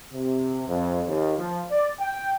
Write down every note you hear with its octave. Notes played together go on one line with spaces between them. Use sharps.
C3
F2
D#2
F3
D5
G5